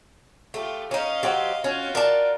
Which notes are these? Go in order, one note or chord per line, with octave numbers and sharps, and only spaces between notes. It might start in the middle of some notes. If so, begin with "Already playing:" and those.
A3 F4 G4
C#4 D#4 D#5 F5
F#3 G4 C5
C#4 F4 F#4
A#4 D5 A5